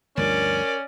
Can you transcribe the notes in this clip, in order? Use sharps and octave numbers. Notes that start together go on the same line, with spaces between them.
D2 G2 F3 C#4 A#4 D5